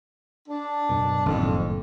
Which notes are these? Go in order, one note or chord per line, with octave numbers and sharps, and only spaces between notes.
D4
F#2 B2
F#1 F2 A2 D#3